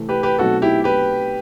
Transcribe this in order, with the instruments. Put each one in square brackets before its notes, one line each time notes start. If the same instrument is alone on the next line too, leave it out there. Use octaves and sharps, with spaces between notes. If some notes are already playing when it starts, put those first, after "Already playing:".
Already playing: [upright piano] C3 E3 A3 C4
[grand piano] G4 B4
G4 B4
[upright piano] B2 F#3 A3 C4 D#4 [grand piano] F#4 A4
[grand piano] E4 G4
G4 B4